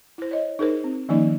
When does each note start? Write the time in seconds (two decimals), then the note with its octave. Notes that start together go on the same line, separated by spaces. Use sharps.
0.18 E4 C5
0.31 C#5 D#5
0.59 D#4 G#4 A#4 C5
0.84 C4
1.09 D#3 F3 A#3 C#4 D#4 D5